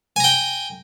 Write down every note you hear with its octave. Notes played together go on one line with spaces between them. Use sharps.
G5 G#5 A#5